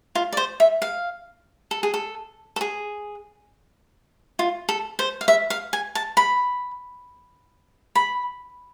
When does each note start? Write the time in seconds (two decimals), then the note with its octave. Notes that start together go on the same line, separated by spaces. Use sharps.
0.15 F4
0.32 D5
0.37 C5
0.60 E5
0.82 F5
1.71 A4
1.83 G#4
1.94 A4
2.56 A4
2.61 G#4
4.39 F4
4.69 A4
4.99 C5
5.21 F5
5.28 E5
5.50 F5
5.73 G#5
5.95 A5
6.17 B5
7.95 B5